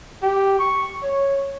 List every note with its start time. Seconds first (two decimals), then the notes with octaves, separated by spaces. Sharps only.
0.22 G4
0.59 C#6
1.03 C#5